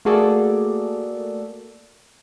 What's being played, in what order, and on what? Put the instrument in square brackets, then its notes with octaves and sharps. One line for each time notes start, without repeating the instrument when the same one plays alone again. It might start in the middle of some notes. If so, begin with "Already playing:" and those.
[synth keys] A3 A#3 F#4 G#4 A4 D5